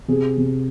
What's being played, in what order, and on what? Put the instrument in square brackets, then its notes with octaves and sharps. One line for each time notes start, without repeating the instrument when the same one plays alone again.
[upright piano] C3 G#4
C3